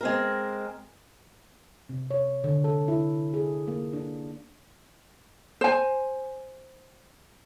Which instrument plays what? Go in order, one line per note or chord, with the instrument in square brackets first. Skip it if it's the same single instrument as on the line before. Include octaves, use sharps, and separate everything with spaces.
[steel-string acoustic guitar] G#3 C4 A#4
[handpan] C3
C#5
D3
A4
E4
G#4
A#3
D4
[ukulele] C5 G#5